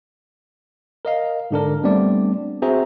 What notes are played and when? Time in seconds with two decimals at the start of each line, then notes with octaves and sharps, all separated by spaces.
1.05 A#4 D#5 F5
1.51 G#2 D3 D4 A#4
1.83 G3 A3 B3 C4 D4 D5
2.62 C4 F#4 G#4 C5 E5 A#5